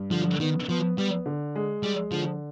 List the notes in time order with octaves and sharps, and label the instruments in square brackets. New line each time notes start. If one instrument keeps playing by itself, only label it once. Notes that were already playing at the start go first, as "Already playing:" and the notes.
Already playing: [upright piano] G2
[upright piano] D3 [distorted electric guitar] F3
[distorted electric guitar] D#3 [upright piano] B3
[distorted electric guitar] F3 [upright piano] B3
[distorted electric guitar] G3 [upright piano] B3
[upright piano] D3
G#3
[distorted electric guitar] G3 [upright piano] G#3
[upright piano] D3 [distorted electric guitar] F3